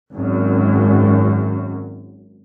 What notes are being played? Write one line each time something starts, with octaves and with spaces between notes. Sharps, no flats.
G#1 F#2